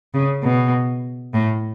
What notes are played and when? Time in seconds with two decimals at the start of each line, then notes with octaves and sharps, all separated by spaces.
0.14 C#3
0.43 B2
1.34 A2